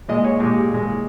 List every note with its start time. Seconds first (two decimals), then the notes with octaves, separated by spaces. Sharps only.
0.08 A#2 G#3 D#5
0.24 C#5
0.40 A#2 G#3 G4
0.71 A#2 G#3